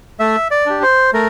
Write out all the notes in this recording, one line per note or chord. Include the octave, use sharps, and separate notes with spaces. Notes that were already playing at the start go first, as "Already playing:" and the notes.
A3 E5
D5
D4 G4
C5
A3 A#4